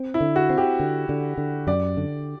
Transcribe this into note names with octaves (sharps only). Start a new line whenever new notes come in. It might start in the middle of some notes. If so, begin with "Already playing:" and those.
Already playing: C4
E4
D3
F#4
C4
G4
D3
D3
D3
F#2 D5
D3